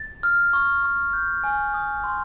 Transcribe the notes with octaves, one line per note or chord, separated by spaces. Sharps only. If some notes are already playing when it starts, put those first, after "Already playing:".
Already playing: A6
F6
C#6
C#6
G6
G#5
D#6
C6